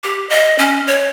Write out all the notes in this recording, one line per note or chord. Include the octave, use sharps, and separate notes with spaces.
G4
D#5
C#4
C#5